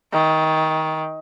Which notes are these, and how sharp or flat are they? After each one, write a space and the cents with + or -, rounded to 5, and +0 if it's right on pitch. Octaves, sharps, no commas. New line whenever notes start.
D#3 +20